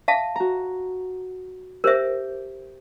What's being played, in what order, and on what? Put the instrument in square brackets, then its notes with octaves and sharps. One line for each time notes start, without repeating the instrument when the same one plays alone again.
[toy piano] E5 F5 A5
[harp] F#4 A#5
[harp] G4 [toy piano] A#4 C5 E5